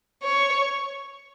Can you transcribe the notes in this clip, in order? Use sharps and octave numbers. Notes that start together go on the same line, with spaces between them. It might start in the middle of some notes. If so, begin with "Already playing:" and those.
C#5